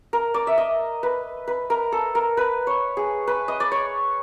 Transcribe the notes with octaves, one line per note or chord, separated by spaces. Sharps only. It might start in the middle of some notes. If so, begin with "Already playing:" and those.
A#4
D5
E5
D#5
B4
B4
A#4
A4
A#4
B4
C#5
G#4
B4
D#5
D5
C#5